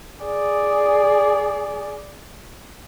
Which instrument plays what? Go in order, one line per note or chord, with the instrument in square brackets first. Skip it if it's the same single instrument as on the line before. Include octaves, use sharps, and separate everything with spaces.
[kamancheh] G#4 D5